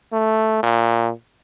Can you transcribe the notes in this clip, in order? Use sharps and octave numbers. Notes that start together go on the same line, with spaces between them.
A3
A#2